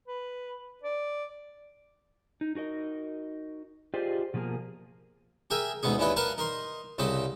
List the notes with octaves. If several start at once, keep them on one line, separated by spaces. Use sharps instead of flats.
B4
D5
D#4
D#4 F#4 A#4 D#5
F4 G4 G#4 C5 D5 D#5
B2 F3 A#3 G#4 A#4
G4 G#4 A#4 E5 G#5
D2 G#2 B3 C#4 G#4
D#2 D3 C#4 E4 B4 D#5
A#4 B4 F5 F#5 A5
D#4 A#4 C6
C2 C#3 C4 D#5 B5